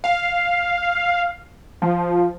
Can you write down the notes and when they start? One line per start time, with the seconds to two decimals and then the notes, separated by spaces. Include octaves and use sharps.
0.04 F5
1.82 F3